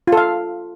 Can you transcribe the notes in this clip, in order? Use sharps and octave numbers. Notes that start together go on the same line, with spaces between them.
F4
A4
F5